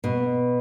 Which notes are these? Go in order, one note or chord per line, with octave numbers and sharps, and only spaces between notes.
B2